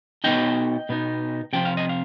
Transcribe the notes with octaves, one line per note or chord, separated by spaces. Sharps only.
B2 B3 D#4 D#5 G5
B2 B3 D#4
C3 F3 C4 F4 G5
F5
D#5
F5